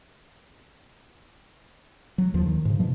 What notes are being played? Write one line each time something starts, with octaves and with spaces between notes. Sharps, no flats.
F#3
D#2 F3
D#3
G#2 C#3
B2 F3 F#3